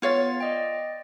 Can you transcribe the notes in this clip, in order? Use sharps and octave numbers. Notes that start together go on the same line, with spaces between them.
B3 F4 C#5 F5 A6
D5 D#5 G5